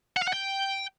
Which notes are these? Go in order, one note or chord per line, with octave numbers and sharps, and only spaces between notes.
F#5
F5
F#5
G5